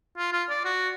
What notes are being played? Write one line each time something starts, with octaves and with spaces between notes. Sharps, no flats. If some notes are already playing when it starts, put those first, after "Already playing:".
F4
F4
D5
F#4